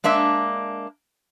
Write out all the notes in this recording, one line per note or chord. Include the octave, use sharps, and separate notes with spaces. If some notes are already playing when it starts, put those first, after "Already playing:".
G#3 A#3 D4 E5